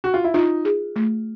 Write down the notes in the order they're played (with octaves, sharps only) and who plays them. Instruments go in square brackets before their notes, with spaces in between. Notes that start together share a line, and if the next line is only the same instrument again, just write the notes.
[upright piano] F#4
F4
E4
[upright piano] D#4 [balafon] F4
[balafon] G#4
A3